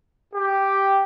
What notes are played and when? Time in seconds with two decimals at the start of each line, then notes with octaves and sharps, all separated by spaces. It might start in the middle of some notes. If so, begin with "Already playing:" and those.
0.34 G4